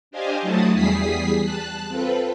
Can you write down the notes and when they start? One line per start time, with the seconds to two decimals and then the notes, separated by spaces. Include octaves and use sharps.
0.11 D4 G4 C5 D#5 F5 G#5
0.42 F#3 A3 E4 F#4 A5 D#6
0.73 E2 G3 G#4 D#6 B6 C7
1.42 A5 F#6
1.88 C4 F4 A4 B4